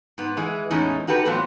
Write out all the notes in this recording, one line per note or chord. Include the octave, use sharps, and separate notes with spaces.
G#2 B3
E3 G#3
E2 A2 G#3 C#4 D#4
D#4 F#4 G4 A4 B4
A2 E3 F#3 B3 C4 F4